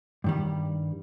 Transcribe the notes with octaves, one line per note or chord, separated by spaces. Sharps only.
G2 D#3 G3